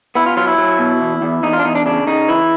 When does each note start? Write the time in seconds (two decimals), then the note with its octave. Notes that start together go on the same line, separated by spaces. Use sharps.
0.15 B3 E4
0.26 F4
0.37 F#3 F4
0.47 E4
0.58 F#3
0.79 B2
1.01 E2
1.22 E2
1.43 E2 D#4
1.53 F4
1.59 D4
1.64 E2 D#4
1.75 D4
1.86 C#3 D4
2.07 C#3 D#4
2.28 E3 E4